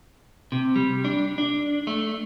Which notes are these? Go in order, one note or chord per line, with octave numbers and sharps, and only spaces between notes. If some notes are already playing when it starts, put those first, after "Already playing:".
C3
G3
D4
D4
A3